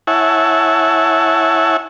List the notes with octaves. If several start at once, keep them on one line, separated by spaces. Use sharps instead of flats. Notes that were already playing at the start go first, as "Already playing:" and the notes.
E4 C#5 E5 F#5 G#5 A5